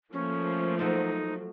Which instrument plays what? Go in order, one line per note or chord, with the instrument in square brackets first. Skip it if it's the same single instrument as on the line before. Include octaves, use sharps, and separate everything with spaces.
[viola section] F3 A3 A#3 [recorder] C#4
[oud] F#3 A4 C5 [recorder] D#4